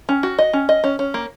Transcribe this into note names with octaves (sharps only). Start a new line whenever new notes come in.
C#4
F#4
D#5
C#4
D#5
C#4
C#4
A#3